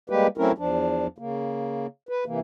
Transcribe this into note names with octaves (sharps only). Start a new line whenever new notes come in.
G3 G#3 A#3 G4 B4
F#3 A3 C4 C#4 E4 A#4
E2 F3 D4
C#3 A#3
B4
C3 E3 A#3